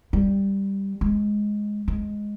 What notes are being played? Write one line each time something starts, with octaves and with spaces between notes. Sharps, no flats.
G3
G#3
G#3